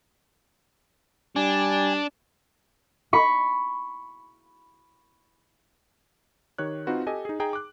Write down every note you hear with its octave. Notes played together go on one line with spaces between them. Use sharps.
G3 D4 G#5
B5 C#6
D#3 G4 C#5 F#6
C4 D#4 F4 F#4 B4
G4 A4 D#5 G#5
D#4 G#4
D#4 G#4 G5 A#5
D6 F#6